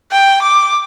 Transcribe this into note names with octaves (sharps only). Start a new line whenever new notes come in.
G5
D6